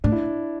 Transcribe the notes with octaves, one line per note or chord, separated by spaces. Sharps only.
A2 D4
E4